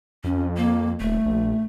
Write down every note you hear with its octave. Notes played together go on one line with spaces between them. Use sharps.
F2 C#4
A#3
D#1 A3
A#1